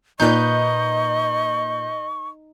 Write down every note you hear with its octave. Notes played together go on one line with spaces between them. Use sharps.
A#2 D#4 B4 D#5 C#6 G6